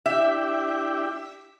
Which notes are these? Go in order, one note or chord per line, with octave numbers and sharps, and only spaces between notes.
D4 E4 G4 E5